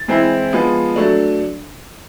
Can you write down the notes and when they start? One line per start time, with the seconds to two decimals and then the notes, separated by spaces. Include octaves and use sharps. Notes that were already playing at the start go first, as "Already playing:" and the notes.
Already playing: A6
0.08 E3 G#3 C4 E4
0.53 F3 G#3 B3
0.96 F#3 A3 D4